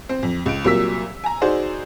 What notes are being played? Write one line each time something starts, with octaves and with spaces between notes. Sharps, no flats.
C4
F2
C#2 D7
C2 A#2 F#3 A#3 E6 B6
G#5 A#5
D#4 F#4 G#4 C5 D5